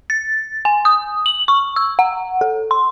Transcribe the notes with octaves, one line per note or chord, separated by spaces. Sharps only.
A6
G#5
D#6
F#7
C#6
E6
F#5
A4
C6